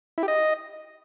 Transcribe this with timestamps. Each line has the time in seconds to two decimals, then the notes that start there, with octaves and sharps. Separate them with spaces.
0.18 E4
0.23 G4
0.28 D#5